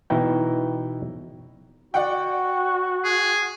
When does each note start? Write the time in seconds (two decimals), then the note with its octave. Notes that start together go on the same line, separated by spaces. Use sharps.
0.10 B2 E3 D#4 E4 G5
1.94 F#4 D5 F#5 G5
3.05 G#4